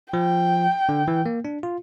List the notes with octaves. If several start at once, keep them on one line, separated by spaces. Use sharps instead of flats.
F3 G5
D3
E3
A#3
D4
F4